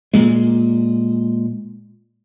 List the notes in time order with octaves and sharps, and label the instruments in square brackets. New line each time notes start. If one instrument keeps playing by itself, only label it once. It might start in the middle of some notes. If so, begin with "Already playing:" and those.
[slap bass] A#2 G#3